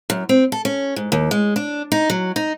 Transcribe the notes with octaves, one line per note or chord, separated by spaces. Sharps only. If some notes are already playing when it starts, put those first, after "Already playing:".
F#2
C4
A4
C#4
G#2
D#2
G#3
D4
D#4
F#3
D#4